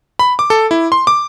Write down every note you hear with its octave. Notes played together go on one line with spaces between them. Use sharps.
B5
D6
A4
E4
C6
D6